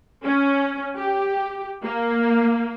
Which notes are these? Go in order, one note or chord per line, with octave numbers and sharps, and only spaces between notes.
C#4
G4
A#3